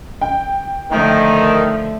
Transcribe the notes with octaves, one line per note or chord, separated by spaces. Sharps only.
G5
D3 D#3 F3 A3